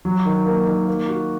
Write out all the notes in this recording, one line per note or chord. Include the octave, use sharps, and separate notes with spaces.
F#3
D#3
A#3
D#3
A#3
F#4